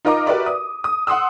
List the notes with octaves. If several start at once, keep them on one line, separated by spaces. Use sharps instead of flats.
D#4 F4 A#4 D#5 A#5 D6
F#4 G4 A#4 B4 D5 E5
D#6
D#6
F#5 C6 D#6 E6